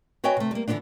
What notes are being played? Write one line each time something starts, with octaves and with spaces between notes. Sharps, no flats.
F#4 B4 C#5 D#5 G5 G#5
C3 A3
G3 A#3
D3 E3 G#3 B3 C4 D4